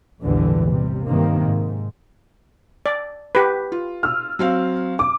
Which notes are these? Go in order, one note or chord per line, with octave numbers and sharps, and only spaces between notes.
A#1 E2 G#2 D3 E3 G3
C3 G3
G2 C3 D#3 A#3
G#2
D5
G4 B4
F4
E6 F6
F#3 C4 F5
D6